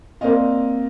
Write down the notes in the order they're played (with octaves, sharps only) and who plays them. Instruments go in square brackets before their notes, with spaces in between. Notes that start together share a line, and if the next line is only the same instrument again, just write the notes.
[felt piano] A#3 C4 D5 D#5 F5